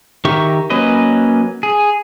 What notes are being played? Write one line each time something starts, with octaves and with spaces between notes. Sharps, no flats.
D#3 G4 A#4 E5 C#6
F#3 A#3 C#4 B4 D#5
G#4